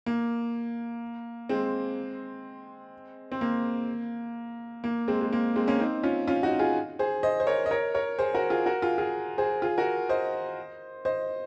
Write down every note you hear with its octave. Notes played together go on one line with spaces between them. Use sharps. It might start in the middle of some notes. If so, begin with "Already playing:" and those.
A#3
G#3 C4
C4
A#3
A#3
G#3 C4
G#3
A#3
G#3 C4
A#3 C#4
C4 D#4
C#4 F4
C#4 F4
D#4 F#4
F4 G#4
G#4 C5
C5 D#5
C5
A#4 C#5
D#5
A#4 C#5
A#4 C#5
G#4 C5
F#4 A#4
F4 G#4
F#4 A#4
F4 G#4
F4 G#4
G#4 C5
F4 G#4
F#4 A#4
C5 D#5
C5 D#5